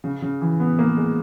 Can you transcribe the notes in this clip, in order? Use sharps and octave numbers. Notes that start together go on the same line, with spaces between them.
C#3
C#3
E3
B3
A#3
G#3